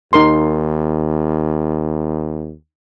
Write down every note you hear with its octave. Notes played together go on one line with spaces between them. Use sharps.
D#2 D#4 A#4 C6